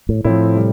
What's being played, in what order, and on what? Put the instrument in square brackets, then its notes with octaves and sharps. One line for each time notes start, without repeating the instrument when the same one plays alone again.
[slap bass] A2
[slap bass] A2 [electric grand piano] F3 C4 E4
[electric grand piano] C3 G3